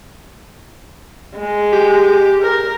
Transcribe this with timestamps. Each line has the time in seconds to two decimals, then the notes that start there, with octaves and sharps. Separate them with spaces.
1.37 G#3
1.73 G4
2.42 A#4